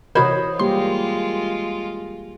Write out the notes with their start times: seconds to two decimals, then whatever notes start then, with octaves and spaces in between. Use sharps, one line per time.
0.15 C3 E3 F#4 A#4 C5 C#5 D#5 B5
0.59 G3 G#3 A#3 F4 G4 C6